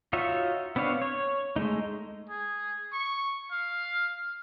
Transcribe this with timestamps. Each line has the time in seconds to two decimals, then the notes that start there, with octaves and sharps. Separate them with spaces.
0.13 D#4 F4 F#4 C#5 E5
0.76 B3 C4 D4 C#5 F5
1.02 C#5
1.56 G#3 A3 D#4
2.29 G#4
2.92 C#6
3.51 F5